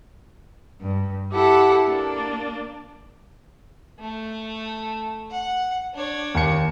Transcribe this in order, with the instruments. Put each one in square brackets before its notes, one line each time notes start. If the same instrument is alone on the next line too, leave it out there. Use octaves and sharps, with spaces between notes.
[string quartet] G2
E4 G4 A4 F#5
A#3 D4
[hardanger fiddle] A3
F#5
D4 C#5
[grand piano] D#2 C#7